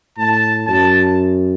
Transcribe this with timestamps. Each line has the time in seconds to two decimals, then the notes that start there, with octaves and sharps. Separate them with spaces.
0.18 A2 A5
0.67 F#2 A5